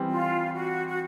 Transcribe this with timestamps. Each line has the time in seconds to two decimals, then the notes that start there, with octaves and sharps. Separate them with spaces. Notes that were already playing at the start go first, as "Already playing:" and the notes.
Already playing: E3 G3 C4
0.10 F4
0.54 F#4
0.88 F#4